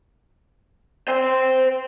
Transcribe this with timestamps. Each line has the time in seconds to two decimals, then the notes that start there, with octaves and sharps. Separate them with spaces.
1.08 C5 G5